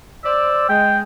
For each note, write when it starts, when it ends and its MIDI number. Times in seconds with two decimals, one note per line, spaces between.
0.24 0.66 72
0.24 0.66 74
0.24 0.68 88
0.69 1.02 56
0.69 0.98 79